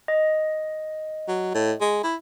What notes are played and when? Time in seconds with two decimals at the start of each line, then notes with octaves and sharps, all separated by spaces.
0.08 D#5
1.28 F#3
1.54 A2
1.81 G#3
2.04 E4